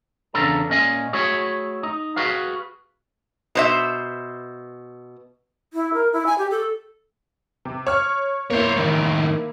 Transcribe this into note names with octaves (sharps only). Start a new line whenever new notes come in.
E2 C#3 D4 A4 A#5
A#2 C#4 D#5 F5 G#5
A3 E4 F#4 G#4 C#5
D#4
F#4 G#4 B4 F5
B2 C5 E5
E4
A#4
E4
G#5
G4
A4
C3
C#5 F6
A#3 E4 C5 C#5
A2 D#3